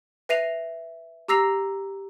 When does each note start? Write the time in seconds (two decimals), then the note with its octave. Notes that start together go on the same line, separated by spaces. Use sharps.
0.29 B4 E5 A#6 C7 D#7 F7
1.28 G4 A#5 E6 A#6 C7 F7